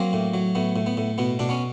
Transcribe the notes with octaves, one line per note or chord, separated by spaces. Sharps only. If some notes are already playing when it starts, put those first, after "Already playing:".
Already playing: F#3 A#3 C4
A2
F#3
A2 B3
A2
B3
A2
B2 B3
B2 D4
B3 C#4